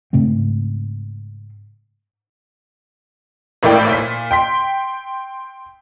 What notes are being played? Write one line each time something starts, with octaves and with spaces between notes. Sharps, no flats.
G#2 C#3 A3 C4
G#1 A2 A#3 E4 D5 G5
A#2 B6
G5 C6 B6